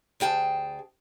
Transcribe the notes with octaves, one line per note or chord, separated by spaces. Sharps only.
D2 G#4 G5 A5